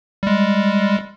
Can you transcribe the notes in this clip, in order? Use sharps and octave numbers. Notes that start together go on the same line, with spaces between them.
G3 G#3